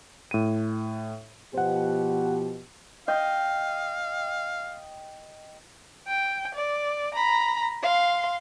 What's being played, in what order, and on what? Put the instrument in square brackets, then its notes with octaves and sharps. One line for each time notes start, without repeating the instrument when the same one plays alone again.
[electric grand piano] A2 D#7
[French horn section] B2 F3 G4 [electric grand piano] C5 F#5
[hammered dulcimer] D#5 G5 [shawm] F5
[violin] G5
D5
A#5 B5
F5 C6